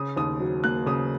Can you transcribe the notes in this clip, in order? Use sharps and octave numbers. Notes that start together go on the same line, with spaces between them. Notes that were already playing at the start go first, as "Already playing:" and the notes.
Already playing: C#3 D#6
D#2 D#6
F#3
A#3 F#6
C#3 D#6